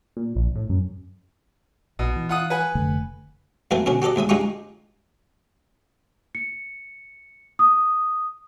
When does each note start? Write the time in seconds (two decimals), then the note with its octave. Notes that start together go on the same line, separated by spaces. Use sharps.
0.17 A#2
0.35 A#1
0.55 A2
0.69 F#2
1.99 A#1 B2
2.16 E3
2.29 F4 F#5 D#6
2.50 B4 F#5 G#5
2.75 F1 D3 A3
3.71 F#2 E3 A3 B3 C4
3.86 B2 D3 D#3 C#4
4.02 F#4 G4 A4 D5 D#5
4.16 D#2 G#2 E5 D#6
4.29 G2 G#3 D#4 F4 G4 C#6
6.35 C#7
7.59 D#6